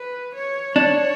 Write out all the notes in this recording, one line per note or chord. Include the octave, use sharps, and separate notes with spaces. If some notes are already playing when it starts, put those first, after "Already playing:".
Already playing: B4
C#5
D4 C#5